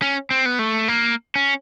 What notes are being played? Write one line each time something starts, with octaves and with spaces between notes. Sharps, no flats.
C#4
C4
B3
A3
A#3
C#4